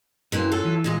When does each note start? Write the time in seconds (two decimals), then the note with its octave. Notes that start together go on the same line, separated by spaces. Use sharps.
0.32 F#2 E3 A#3 C4
0.52 F#3 F4 A4
0.65 E3
0.84 A#2 G#3 D#5